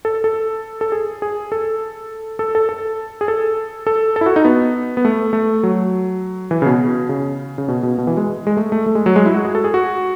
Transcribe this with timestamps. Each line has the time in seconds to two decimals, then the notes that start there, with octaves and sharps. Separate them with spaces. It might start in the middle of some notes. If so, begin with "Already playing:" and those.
0.05 A4
0.24 A4
0.81 A4
0.92 G#4
1.22 G#4
1.52 A4
2.39 A4
2.55 A4
2.69 A4
3.21 G#4
3.28 A4
3.87 A4
4.16 A4
4.21 E4
4.26 F#4
4.36 D#4
4.45 B3
4.97 B3
5.05 A3
5.33 A3
5.63 F#3
6.51 E3
6.62 C#3
6.66 B2
7.09 C#3
7.58 C#3
7.68 B2
7.83 B2
7.98 B2
8.07 E3
8.17 G#3
8.47 G#3
8.57 A3
8.72 A3
8.86 A3
8.95 G#3
9.06 F#3
9.16 G#3
9.26 E4
9.34 F#4
9.45 G#4
9.55 A4
9.64 G#4
9.74 F#4